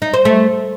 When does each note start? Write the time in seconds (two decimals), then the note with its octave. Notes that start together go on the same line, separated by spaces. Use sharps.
0.02 D#4
0.14 C5
0.25 A3